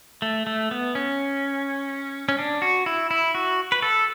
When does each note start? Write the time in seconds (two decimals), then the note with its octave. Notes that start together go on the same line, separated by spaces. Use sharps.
0.22 A3
0.47 A3
0.71 B3
0.95 C#4
2.29 C#4
2.39 D4
2.62 F#4
2.86 E4
3.11 E4
3.35 F#4
3.72 B4
3.82 A4